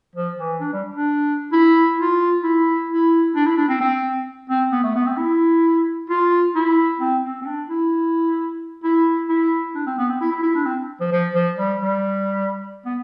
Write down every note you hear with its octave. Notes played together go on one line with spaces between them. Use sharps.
F3
E3
D4
G3
D4
E4
F4
E4
E4
D4
E4
D4
C4
C4
C4
B3
A3
B3
C4
E4
F4
E4
C4
C4
C4
D4
E4
E4
E4
D4
C4
B3
C4
E4
E4
E4
D4
C4
F3
F3
F3
G3
G3
B3